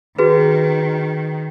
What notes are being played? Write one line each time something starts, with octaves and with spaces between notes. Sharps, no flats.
D#3 F#4 G#4 B4